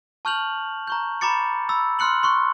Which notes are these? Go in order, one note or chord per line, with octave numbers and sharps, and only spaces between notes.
A5 C#6 F6 G6 F7 F#7
A#5 C#6 G6
A#5 B5 D6 A6 C#7
B5 E6 A6
C6 F6 F#6 C#7 F#7
C6 C#6 F#6